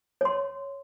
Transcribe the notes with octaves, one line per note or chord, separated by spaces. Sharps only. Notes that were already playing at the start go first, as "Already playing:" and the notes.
C#5 C6